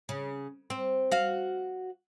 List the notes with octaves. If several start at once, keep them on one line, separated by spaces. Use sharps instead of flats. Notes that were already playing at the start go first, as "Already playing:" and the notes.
C#3
C4
F#4 F5